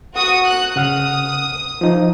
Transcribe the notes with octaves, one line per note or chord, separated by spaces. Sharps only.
F#4 D#6
F#6
C#3 F#5 D#6 F6
F3 D#4